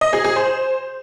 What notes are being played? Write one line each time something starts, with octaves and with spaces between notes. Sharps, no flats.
D#5
G#4
G#4
C5